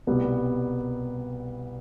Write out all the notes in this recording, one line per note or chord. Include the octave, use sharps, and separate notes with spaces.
C2 B2 G3 B3